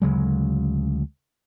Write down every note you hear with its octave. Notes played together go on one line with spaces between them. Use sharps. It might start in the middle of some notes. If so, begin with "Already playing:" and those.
D2 C#3 F#3 G#3